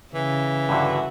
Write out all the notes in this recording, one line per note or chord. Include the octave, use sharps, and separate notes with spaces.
C#3 E3
G2 D3 F#4 E5